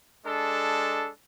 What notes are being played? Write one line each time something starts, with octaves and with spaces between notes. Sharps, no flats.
G#3 D4 A4